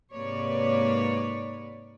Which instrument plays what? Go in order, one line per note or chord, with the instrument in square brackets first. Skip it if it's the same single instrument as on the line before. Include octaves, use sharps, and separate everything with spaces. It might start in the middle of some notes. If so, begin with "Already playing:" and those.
[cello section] G#2 C3 A#3 B4 C#5 D5